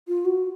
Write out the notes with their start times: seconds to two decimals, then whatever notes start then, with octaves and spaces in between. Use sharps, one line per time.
0.08 F4
0.25 F#4